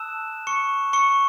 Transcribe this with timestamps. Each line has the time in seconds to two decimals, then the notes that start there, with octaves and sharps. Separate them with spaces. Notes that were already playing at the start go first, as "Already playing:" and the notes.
Already playing: A5 D#6 E6 F#6 E7
0.47 C#6 C#7
0.93 C#6 C#7